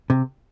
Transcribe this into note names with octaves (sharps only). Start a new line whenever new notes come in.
C3